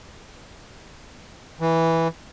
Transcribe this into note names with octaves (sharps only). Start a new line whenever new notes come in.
E3